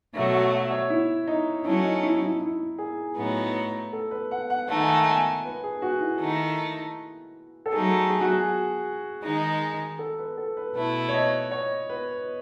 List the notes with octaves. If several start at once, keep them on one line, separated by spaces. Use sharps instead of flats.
B2 F#3 A3
F#5
E5
C#5
E4
D#4
F#3 A3 C#4 E4
D#4
E4
E4
E4
G#4
A2 F#3 B3 D#4
A4
B4
F#5
F#5
D#3 A3 D#4 F#5
G#5
F#5
G#5
B4
G#4
F#4
E4
D#3 A3 D#4
A4
F#3 A3 D#4 G#4
G#4
F#4
G#4
D#3 G#3 D#4
A4
B4
A4
B4
B2 A3 E4 B4
C#5
D#5
C#5
B4